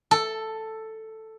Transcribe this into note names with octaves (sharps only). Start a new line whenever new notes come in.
A4